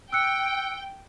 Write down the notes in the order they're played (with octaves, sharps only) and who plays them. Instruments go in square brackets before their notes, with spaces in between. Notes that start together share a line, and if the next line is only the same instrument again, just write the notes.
[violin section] G5 [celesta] E6 F#6 C#7